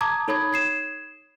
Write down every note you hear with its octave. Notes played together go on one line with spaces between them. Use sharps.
A5 A#5 D6 D#6 G#6
D#4 A4 C#5 B5 D#6 G#6
G#6 C7 E7